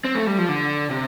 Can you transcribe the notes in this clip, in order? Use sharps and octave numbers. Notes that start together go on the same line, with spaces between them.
C4
A3
G3
F3
D3
C3